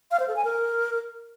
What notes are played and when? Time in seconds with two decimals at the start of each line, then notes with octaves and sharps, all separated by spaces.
0.11 F5
0.20 C5
0.28 A4
0.36 G#5
0.45 A#4